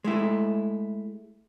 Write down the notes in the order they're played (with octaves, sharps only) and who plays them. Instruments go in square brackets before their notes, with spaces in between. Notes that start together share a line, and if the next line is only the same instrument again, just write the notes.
[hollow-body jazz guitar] G#3 A3 E4